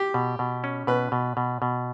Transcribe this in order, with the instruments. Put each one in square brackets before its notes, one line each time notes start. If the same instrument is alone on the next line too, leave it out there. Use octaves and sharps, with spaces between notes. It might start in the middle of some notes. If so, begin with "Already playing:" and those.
Already playing: [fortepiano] G4
[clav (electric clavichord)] B2
B2
C#4
[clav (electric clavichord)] B2 [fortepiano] B4
[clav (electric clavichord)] B2
B2
B2